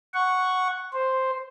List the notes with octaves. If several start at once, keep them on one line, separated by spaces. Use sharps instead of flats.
F#5 C#6
C5